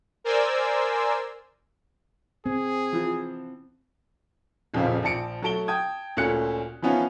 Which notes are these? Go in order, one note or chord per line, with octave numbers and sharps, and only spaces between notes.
A#4 C5 D5 G#5 C6 E6
C4 G#4
E3 F3
D#1 F2 A#2 C#3 C4 F5
A#1 F3 A5 C#7 D7
F#3 A3 A5 D7 G7
G5 A5 D#6 G#6
D2 A#2 A3 C#4 F#6 C#7
E3 F3 B3 C#4 D#4 F4